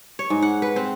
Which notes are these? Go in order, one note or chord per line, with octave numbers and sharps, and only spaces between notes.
C#5
G#2
F#5
B4
C4